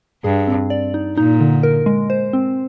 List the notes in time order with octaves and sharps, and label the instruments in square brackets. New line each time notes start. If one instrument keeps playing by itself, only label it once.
[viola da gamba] G2 [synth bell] G#4
[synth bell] C4
D5
D#4
[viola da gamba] A#2 [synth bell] D#4
[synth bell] D3
A#4
G#3
C5
C4